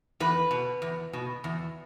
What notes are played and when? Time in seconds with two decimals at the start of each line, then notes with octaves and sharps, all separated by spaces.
0.20 E2 B4
0.51 B2
0.82 E2
1.13 B2
1.44 E2